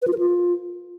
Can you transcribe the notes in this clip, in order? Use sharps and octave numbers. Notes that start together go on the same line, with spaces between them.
B4
F4
A#4
F4